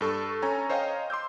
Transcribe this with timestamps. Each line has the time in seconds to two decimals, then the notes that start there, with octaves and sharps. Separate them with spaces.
0.01 G2 A4 C#6
0.42 C#4 A4 C#5 G#5 A#5 C#6
0.70 C5 C#5 D#5 F5 G5 A#5
1.10 C6 D6 E6 G6